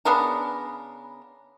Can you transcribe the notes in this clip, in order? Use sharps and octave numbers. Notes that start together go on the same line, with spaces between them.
C#3 B3 D4 A#4